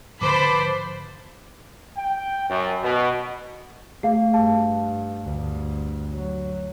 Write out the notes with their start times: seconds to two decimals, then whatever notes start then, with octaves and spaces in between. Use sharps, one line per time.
0.21 G#2 D3 F3 B4 C5 A5 B5 D6
1.97 G5
2.50 F#2
2.83 B2
4.03 A3 G#4 F5
4.33 G2 F5 A5
5.24 D2 G2
6.13 F#3